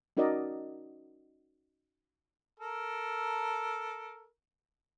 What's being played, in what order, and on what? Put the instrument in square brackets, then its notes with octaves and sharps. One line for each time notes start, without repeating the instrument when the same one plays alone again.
[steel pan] C#4 D#4 F#4 A#4 D5 D#5
[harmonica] A4 A#4